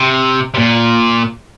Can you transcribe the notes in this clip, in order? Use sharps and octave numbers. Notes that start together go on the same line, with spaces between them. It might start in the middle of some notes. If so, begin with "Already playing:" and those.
Already playing: C3
C3
A#2